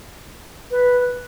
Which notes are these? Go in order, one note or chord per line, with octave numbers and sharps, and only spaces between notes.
B4